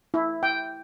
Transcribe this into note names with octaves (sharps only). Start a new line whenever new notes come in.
E4
G5